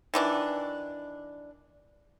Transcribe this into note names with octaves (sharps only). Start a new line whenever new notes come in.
D#3 E3 D4